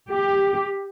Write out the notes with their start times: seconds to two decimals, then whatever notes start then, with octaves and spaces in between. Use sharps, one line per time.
0.10 G4